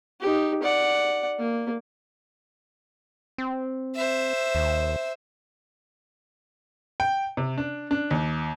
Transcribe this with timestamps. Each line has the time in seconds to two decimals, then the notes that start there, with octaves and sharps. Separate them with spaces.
0.21 D#4 G4
0.63 D5 F#5
1.39 A#3
3.38 C4
3.95 C5 E5
4.55 D#2
7.00 G5
7.37 C3
7.58 D4
7.91 D4
8.11 D#2